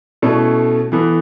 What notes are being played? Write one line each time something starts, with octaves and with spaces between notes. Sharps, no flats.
B2 A3 C#4 E4 A4
E3 B3 A4